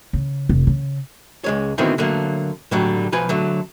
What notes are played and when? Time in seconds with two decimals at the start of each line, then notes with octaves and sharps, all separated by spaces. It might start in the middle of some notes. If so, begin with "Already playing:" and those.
0.13 C#3
0.49 F1
0.67 C#3
1.44 C#2 G#3 C#5
1.78 B2 D3 D#3 B3 C4 E4
1.98 D3 F#3 A3 A#3
2.71 A2 D3 F#3 G3
3.12 B1 F3 B4 G#5
3.29 D3 F#3 A3